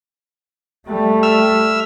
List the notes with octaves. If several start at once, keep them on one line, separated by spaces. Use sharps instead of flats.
G3 A3
E5 E6 F6